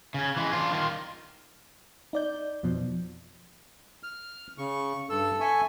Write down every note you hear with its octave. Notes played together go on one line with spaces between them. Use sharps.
C#3 C#4
E3 G#3
D4 F4
D#3 F4
D#4 D5 G6
F2 B2 F3
F6
C#3 C#6
G2 A4 E6
E5 G#5 C#6